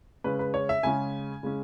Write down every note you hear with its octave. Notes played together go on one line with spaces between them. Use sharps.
C#3 G#3 C#4 B4
B4
C#5
E5
C#3 G#3 C#4 G#5
C#3 G#3 C#4